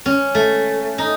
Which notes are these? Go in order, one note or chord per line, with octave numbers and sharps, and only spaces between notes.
C#4
A3
D#4